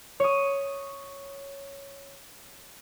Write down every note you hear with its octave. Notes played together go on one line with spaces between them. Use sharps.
C#5 D#6